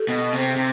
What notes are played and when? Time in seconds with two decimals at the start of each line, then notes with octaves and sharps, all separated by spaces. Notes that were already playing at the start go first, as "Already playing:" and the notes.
Already playing: G4 A4
0.09 B2
0.33 C3
0.56 C3